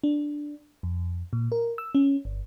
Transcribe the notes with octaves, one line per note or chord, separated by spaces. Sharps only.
D4
F2
A#2
A#4
E6
C#4
G1